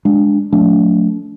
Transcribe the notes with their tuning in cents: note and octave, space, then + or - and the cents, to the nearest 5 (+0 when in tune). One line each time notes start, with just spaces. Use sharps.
G#3 +0 D4 +0
F#3 -40 A3 +0 D4 -35